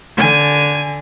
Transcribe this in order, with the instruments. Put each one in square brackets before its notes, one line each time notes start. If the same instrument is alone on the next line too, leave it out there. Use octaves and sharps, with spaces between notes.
[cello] D3 [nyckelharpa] G#5